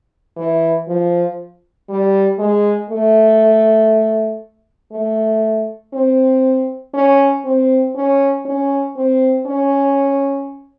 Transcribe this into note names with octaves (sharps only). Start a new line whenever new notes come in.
E3
F3
G3
G#3
A3
A3
C4
C#4
C4
C#4
C#4
C4
C#4